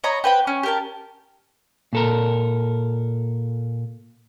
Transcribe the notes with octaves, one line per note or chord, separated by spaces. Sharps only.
C#5 D#5 A#5 B5
G4 B4 C5 G5
C#4
G4 A#4 A5
A#2 A4 A#4